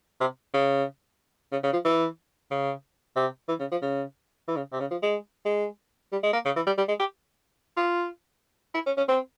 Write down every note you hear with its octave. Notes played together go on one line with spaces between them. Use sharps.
C3
C#3
C#3
C#3
F3
E3
C#3
C3
E3
C#3
F3
C#3
E3
C#3
C3
C#3
F3
G#3
G#3
G3
G#3
A#3
C#3
E3
G3
G3
G#3
G4
F4
E4
C#4
C#4
C4